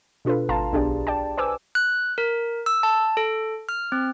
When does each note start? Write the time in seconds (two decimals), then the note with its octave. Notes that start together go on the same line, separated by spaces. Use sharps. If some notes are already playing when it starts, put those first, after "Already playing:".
0.25 B2 D4 F4 A4 B4
0.49 G#1 F5 A5 A#5 C6
0.73 B1 D4 G4 G#4 D5
1.07 D5 G5 A5
1.38 B4 C5 G#5 D6 E6
1.75 F#6
2.18 A#4
2.66 E6
2.83 A5
3.17 A4
3.69 F6
3.92 C4